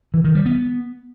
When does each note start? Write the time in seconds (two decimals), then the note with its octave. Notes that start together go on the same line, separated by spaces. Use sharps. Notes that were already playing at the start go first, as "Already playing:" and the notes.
0.14 E3
0.24 D#3
0.35 G3
0.46 B3